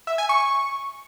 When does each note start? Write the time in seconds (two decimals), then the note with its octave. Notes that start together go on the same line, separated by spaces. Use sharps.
0.07 E5
0.18 G#5
0.29 C#6